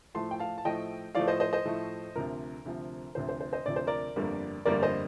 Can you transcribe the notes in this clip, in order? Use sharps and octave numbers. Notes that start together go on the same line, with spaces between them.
A2 F3 A3 A5 C6
G5
F5 A5
A5
A2 F3 A3 D#5 G5
A2 F3 A3 D5 F5
C5 D#5
C5 D#5
C5 D#5
A2 F3 A3
D2 C3 F3 A#4
D2 C3 F3
D2 C3 F3 C5
C5
C5
C5 D#5
D2 C3 F3 D5
C5
A#4 D5
G1 F2 D3 G3 A#3
G1 F2 D3 G3 A#3 A#4 D5
C5 D#5